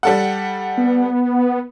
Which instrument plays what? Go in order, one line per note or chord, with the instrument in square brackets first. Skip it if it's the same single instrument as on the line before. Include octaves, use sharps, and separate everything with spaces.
[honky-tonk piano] G3 A4 F#5
[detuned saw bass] B3